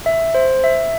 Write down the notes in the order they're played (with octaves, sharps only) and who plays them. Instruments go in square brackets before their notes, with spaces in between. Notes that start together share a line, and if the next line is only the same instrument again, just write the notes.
[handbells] E5
C5
E5